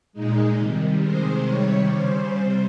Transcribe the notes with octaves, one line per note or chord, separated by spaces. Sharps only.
A#2 G#3 D#4
C3 D#3 G3
C3 D#3 G#3 C5
C3 D#3 G3 C#5
C#3 G3 C5
C3 G3